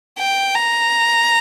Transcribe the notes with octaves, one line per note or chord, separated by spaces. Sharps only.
G5
A#5